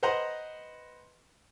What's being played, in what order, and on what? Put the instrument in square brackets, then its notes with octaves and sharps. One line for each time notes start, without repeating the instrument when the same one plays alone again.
[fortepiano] B4 C5 D#5 F#5 A#5 C6